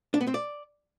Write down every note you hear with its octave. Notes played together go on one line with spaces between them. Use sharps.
D4
B3
C4
D5